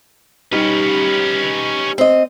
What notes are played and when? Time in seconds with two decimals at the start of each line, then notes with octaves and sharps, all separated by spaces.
0.52 G3 C#4 D#4 G4 B4
1.98 C4 D#5